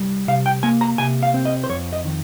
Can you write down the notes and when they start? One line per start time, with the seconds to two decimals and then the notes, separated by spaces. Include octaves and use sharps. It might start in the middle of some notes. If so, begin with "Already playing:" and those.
Already playing: C2 G3
0.28 C3 F5
0.46 G5
0.63 A#3 G#5
0.81 A#5
0.98 C3 G#5
1.23 F5
1.34 C4
1.46 D#5
1.64 C5
1.70 F2 C#5
1.93 D#5
2.05 D#3